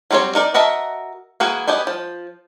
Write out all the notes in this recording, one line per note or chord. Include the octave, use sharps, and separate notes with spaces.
F#3 G3 C4 C5 C#5
D#4 A#4 D5
F#4 A#4 D#5 E5 A5
E3 A#3 F#4 G#4
B3 G4 D#5 G#5
F3